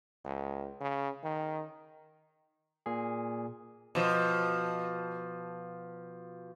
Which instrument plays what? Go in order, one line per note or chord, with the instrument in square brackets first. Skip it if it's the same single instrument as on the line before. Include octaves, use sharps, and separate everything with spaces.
[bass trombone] C#2
C#3
D#3
[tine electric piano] A#2 G#4
[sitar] B2 F3